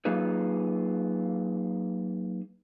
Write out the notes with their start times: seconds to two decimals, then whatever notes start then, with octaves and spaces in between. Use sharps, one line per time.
0.05 F#3 A#3 D#4 F4 G#4 B4